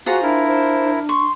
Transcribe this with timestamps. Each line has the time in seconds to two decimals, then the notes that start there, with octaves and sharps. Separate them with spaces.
0.06 F4 F#4 G#4 C5 F#5 A#5
0.23 D4 E4 A#4
0.47 C5
1.09 C6 C#6